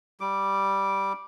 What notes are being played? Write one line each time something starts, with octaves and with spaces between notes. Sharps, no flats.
G3 D6